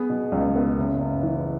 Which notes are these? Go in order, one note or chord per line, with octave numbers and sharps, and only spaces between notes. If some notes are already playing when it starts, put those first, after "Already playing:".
Already playing: B3 G#4
B2
C#2
B3
F#1
F#1
E3